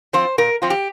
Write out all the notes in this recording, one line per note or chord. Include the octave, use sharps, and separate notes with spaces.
F3 C4 F4 C5
A#2 A#4
F3 C4 F4
G4